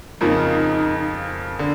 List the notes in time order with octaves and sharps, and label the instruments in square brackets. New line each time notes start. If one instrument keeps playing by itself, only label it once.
[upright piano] F2 C#3 F3 A#3 [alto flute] D#4
[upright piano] D3